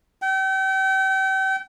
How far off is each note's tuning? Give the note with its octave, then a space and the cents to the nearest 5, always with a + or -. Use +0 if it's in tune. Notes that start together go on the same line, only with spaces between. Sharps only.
G5 -40